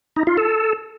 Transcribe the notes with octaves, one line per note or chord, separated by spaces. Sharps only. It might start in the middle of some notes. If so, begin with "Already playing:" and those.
D#4
F4
A4